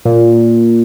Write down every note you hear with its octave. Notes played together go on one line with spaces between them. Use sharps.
A#2